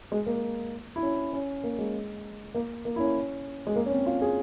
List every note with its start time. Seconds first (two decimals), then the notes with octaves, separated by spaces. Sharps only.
0.12 G#3
0.27 A#3
0.96 E4
1.03 C#4
1.33 C#4
1.64 A#3
1.78 G#3
2.55 A#3
2.85 A#3
2.96 E4
3.00 C#4
3.67 G#3
3.76 A#3
3.86 C#4
3.92 C4
4.06 F4
4.22 G#4